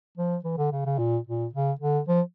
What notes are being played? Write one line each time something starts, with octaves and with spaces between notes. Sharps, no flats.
F3
E3
D3
C#3
C#3
A#2
A#2
C#3
D3
F3